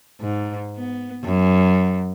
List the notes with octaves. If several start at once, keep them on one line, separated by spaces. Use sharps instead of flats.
G#2
B3
F#2